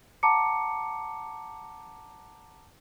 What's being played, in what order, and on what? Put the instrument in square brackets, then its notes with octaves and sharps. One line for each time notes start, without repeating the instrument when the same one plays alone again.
[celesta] F#5 A5 A#5 D6 C#7